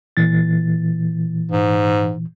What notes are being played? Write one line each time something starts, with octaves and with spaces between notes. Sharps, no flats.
A#2 E3 A6
G#2